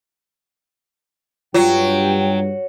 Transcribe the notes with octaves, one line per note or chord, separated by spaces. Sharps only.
G2 F#3 F4 G5